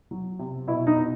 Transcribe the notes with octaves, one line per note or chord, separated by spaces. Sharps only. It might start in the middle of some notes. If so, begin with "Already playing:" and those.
F#3
C3
B2 E4
D#4
B2